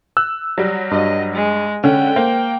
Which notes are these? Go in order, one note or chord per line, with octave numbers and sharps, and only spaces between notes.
E6 F#6
F#3 G3
G2 D#5
G#3
D3 C#4 G5
A#3 C5